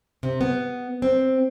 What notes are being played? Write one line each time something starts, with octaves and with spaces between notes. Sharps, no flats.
C3
B3
C4